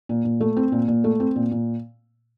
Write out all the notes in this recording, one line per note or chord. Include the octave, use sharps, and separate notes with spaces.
A#2
A#2
A3
C4
A#2
A#2
A3
C4
A#2
A#2